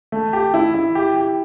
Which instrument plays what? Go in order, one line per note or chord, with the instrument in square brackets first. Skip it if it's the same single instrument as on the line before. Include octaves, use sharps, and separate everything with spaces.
[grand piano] A3
G4
E4
E4
G4
G4